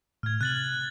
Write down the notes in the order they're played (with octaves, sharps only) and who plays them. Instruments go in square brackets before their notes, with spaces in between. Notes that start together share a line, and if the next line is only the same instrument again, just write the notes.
[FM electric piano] A2 [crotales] F6 G#6
[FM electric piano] C3 [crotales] F#6 A6 F#7